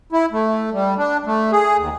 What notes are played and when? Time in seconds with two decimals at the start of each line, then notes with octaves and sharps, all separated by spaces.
0.12 E4
0.32 A3
0.73 G3
0.98 D4
1.26 A3
1.52 G#4
1.77 D#2